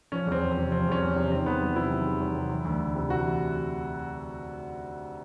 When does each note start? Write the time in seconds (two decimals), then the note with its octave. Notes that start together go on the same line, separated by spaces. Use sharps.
0.12 F3 C#4
0.27 E2 C4
0.41 E2
0.52 C4
0.57 C3
0.72 F3 C4
0.87 E2 C#4
1.02 E2
1.16 C3
1.31 D#3 C4
1.46 E2 B3
1.61 F#3
1.76 C3 E4
1.91 D#3
2.06 E2
2.20 F#3
2.35 C3
2.50 E3
2.65 D2
2.80 D2
2.95 C3
3.09 E3 F#4